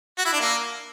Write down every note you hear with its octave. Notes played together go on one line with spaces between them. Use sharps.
F#4
E4
D4
A#3